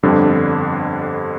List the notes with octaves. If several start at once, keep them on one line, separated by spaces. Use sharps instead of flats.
G1 F2 D3 G3 D4